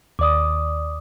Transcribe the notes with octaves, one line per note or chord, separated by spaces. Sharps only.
D#2 D5 D6 D#6